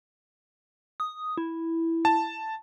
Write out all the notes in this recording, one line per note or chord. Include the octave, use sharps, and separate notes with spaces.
D#6
E4
A5